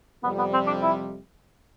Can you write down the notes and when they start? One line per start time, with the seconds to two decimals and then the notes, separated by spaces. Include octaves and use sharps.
0.23 F2 C3 G3 B3
0.38 B3
0.53 C4
0.67 D4
0.82 E4